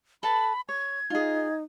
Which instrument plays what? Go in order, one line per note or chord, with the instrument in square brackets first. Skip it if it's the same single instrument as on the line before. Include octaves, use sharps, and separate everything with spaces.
[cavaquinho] A4 B4 A5 [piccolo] B5
[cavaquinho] C#5 [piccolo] G#6
[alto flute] D#4 [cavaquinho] F4 G#4